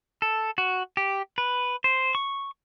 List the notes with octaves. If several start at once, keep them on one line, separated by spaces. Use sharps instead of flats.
A4
F#4
G4
B4
C5
C#6